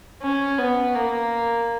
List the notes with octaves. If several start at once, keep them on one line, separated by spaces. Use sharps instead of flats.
C#4
B3
A#3